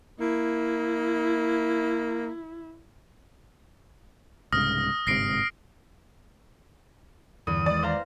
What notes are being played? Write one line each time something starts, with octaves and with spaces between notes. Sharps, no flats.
A#3 E4
C2 G#2 C#3 D#6 F6 A#6
G1 G#2 C3 A#6 C7 D7
E2 G2 D3 D#6
D#3 G#3 D5
C5 F5 A#5